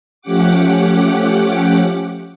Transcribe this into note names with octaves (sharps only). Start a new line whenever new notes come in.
F3 A3 C#4 G4 F#5 D6